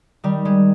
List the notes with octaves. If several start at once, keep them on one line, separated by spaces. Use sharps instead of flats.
D#3 G3
G#3